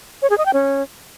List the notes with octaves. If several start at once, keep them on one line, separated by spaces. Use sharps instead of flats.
C#5
G#4
D#5
G5
C#4